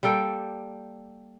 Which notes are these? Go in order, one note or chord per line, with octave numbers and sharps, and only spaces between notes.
G3 A#3 A4 G5